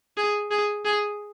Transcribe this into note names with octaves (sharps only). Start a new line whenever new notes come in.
G#4
G#4
G#4